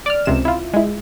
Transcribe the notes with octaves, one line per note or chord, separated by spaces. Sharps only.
D5 F6
C#2 C3 E7
E4 F4
G#3 E4